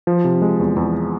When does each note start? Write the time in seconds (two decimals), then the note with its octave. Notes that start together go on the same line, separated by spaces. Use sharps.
0.07 F3
0.24 C3
0.42 G#3
0.60 E2
0.76 E2